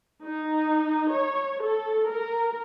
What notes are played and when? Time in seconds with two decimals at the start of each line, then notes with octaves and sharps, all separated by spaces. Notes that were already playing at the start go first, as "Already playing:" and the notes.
0.25 D#4
1.13 C#5
1.62 A4
2.10 A#4